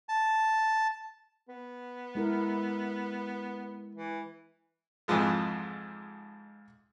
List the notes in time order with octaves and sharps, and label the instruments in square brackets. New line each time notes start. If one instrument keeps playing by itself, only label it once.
[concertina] A5
[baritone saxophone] B3
[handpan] G#3 E4 A#4
[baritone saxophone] E3
[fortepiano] F2 G#2 E3 F3 G#3